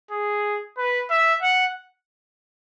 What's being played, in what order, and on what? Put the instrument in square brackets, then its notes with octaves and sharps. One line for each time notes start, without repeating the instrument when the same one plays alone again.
[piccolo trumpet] G#4
B4
E5
F#5